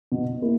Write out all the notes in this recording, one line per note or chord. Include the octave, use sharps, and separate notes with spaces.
B2
A#3 E4